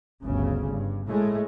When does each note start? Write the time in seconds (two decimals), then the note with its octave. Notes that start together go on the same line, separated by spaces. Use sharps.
0.22 G1 D2 C#3
0.69 G2
1.05 A2 G#3 A3